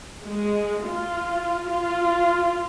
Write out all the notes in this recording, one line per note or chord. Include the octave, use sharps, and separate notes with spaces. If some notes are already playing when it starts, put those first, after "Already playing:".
G#3
F4
F4